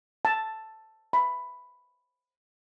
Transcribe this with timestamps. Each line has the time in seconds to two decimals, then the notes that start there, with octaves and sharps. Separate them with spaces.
0.25 A5
1.13 B5